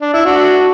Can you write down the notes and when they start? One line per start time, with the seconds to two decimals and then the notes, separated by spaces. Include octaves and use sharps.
0.01 D4
0.13 E4
0.25 D4 F#4